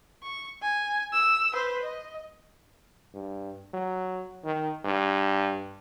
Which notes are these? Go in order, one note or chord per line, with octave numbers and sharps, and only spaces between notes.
C#6
G#5
E6
B4 C5
D#5
G2
F#3
D#3
G2